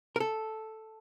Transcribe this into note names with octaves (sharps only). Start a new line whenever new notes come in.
A#4
A4